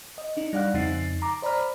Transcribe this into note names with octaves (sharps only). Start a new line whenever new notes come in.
D#5
D4 D#4
G3 D5 F5 F#5 F#6
F2 C#3 C4 D#4 A6 C7
A#5 D6
C5 D5 A#5 B5 F6